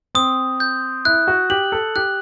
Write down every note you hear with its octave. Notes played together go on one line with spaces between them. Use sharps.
C4 D#6
G6
E4 F#6
F#4
G4 F#7
A4
G4 F#6